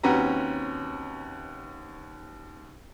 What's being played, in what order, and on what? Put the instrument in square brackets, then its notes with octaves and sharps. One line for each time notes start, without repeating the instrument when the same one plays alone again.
[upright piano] D#2 C4 C#4 F#4 B4 A#5